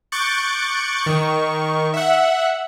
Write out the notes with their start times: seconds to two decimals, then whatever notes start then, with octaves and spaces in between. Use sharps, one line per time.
0.12 C#6 D6 F#6 G6 A6 C#7
1.03 D#3 C#6
1.94 E5 F#5